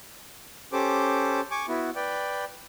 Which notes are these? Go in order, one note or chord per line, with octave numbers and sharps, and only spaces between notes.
C#4 G4 A4 C5 D6
G#5 C#6 D6
B3 E4 F#4
B4 D5 G5